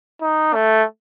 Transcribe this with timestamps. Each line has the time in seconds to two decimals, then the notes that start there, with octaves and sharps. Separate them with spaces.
0.22 D#4
0.54 A3